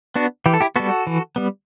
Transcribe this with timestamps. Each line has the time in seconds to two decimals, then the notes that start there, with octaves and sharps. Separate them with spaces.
0.16 B3 D4 F#4
0.46 E3 G4
0.54 A4
0.61 E4 G4
0.76 G3 B3 F#4 A4
1.07 E3
1.36 G3 B3